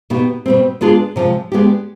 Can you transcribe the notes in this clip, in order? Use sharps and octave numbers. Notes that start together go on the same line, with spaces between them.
B2 B3 D#4 G4
B2 G3 C4
G#3 B3 D4 F4 G#4
C3 F3 G#3
G#3 B3 D4 G4